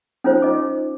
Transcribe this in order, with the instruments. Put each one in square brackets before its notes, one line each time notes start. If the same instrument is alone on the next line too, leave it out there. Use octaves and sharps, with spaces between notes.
[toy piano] C#4 D#4 F4 C5
D#5 D6